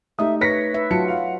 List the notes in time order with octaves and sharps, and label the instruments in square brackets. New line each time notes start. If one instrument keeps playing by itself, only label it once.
[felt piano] A3 D#4 G4 [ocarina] E5 [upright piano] D#6
[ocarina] B4 [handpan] C#5 [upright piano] A#6 B6 C#7
[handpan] B4 E5
[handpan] F#3 F4 F#4 [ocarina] A5 [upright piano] C#7
[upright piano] F5 [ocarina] F#5